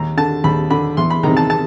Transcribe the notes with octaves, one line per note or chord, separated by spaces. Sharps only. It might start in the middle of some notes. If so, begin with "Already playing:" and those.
Already playing: D#2 A#5
D3 A5
D#2 B5
D3 B5
E2 C6
B5
C3 D#3 A#5
A5
A5